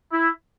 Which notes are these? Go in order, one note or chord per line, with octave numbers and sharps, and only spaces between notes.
E4